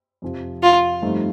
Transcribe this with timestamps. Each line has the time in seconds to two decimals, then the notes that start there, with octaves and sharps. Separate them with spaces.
0.22 F2 C3 F3
0.63 F4
1.02 G2 F3 A3 C4 D#4